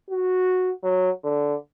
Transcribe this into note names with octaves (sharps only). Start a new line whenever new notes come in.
F#4
F#3
D3